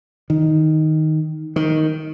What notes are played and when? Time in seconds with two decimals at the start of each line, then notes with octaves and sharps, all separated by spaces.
0.30 D#3
1.56 D#3